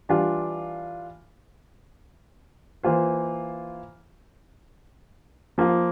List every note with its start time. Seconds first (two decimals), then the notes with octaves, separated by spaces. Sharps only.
0.09 E3 G3 D4 F4
2.83 E3 A#3 F4 C5
5.58 F3 A#3 F4